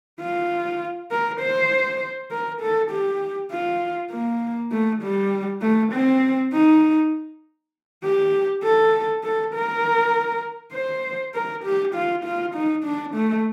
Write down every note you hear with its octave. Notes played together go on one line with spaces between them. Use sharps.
F4
A#4
C5
A#4
A4
G4
F4
A#3
A3
G3
A3
C4
D#4
G4
A4
A4
A#4
C5
A#4
G4
F4
F4
D#4
D4
A3